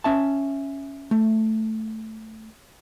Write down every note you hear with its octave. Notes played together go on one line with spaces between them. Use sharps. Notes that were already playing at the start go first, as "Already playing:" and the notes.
C#4 E5 A5
A3